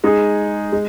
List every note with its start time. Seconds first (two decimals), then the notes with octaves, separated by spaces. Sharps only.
0.04 G#3 D#4 G#4
0.73 G#3